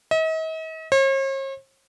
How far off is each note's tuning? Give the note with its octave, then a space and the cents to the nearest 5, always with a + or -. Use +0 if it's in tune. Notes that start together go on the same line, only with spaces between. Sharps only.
D#5 +45
C#5 -45